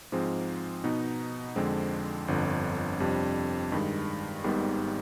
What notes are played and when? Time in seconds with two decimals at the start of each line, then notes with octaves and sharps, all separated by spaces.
0.12 G#2 F3 G#3 C4
0.84 B2 B3 D#4
1.56 F2 D3 G#3 C4
2.28 G1 F2 D3
3.00 F2 C3 G3 D4
3.72 G2 D#3 G#3
4.44 G#1 G#2 D#3 G3 B3